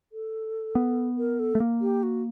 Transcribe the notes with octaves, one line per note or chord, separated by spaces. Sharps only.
A4
B3
A#4
A4
A3
A#3
G4
F#4